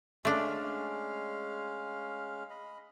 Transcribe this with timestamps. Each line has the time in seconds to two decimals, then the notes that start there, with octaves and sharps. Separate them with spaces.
0.25 G#3 A3 C#4 D4 F5
2.50 D#5 B5